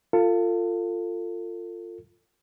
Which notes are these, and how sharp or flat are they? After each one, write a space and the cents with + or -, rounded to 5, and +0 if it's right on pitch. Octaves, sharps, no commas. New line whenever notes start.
F4 +0 A4 +30